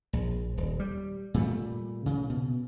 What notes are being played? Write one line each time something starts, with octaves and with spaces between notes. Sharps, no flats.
A#1
D#1
G3
A#2 G3 A3
C#3
B2